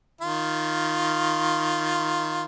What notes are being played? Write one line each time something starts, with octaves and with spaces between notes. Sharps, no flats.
D#3 F4